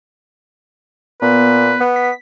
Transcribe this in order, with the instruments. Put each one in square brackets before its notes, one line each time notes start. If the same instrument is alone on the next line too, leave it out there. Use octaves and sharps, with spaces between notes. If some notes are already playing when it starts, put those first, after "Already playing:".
[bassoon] A#2 [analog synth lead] B3 [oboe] B4
[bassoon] B3
[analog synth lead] B6